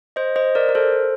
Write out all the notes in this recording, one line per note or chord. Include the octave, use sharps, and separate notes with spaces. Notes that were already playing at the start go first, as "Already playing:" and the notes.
C5 D#5
C5 D#5
A#4 D5
A#4
A4 C5